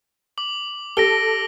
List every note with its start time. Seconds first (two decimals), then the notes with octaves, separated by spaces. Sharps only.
0.38 D6 F#7
0.97 G4 A4 A#6 D7 G7